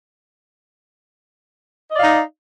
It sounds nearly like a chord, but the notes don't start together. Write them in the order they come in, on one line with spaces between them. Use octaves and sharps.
D#5 D5 F5 D#4